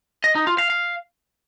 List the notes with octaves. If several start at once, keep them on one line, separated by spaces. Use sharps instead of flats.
D#5
D#4
F4
F5
F5